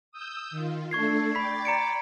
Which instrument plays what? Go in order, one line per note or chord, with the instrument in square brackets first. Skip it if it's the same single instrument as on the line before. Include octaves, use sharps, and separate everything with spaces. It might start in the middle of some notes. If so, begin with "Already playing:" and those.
[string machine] D#6 E6 G6
D#3 F4
[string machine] A3 D4 A4 [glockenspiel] C#6 G#6 C7
[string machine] D5 G5 A6 [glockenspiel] B5 B6
[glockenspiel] A#5 C#7 D7